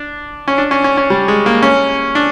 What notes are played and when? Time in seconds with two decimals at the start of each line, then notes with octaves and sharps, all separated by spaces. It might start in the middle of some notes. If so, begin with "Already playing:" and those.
Already playing: D4
0.48 C#4
0.58 D4
0.71 C#4
0.84 C#4
0.97 C#4
1.10 G3
1.28 G#3
1.46 A#3
1.63 C#4
2.15 D4